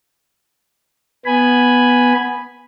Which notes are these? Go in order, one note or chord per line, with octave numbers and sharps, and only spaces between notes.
B3 G#5 B5